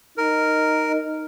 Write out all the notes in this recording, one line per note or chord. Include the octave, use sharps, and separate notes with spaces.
D#4 A#4